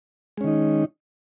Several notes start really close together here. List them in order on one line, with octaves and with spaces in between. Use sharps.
G#3 C#4 D#3 D#4